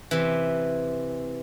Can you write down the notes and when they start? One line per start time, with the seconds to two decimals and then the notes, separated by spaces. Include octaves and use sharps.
0.11 C3 E3